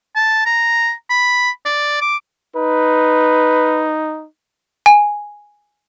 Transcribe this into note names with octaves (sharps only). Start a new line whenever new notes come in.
A5
A#5
B5
D5
D6
D#4 B4
G#5